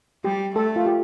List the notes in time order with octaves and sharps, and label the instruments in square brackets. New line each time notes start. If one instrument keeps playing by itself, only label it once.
[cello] G3 [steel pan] G4
[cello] A3 [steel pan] A4
[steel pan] F4
G4